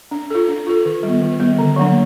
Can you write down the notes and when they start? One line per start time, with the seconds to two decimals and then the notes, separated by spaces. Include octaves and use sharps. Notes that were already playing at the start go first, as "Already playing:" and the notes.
0.11 D4
0.30 F4 A4
0.48 D4
0.67 F4 A4
0.85 D#3
1.03 G3
1.08 B3
1.22 D#3
1.40 G3 B3
1.59 D3
1.76 F#3 A#3 D4